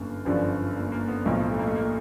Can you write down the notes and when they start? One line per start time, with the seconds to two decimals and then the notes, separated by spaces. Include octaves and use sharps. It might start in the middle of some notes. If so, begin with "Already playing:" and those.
Already playing: G1 F#2 A#3
0.25 G1 F#2 D3 F3
0.76 A#3
0.92 A#3
1.08 B3
1.25 B1 A2 F3 A#3
1.51 A3
1.59 A#3
1.67 A3
1.75 A#3